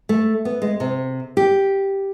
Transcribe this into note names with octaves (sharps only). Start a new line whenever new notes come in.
A3
B3
G#3
C3
G4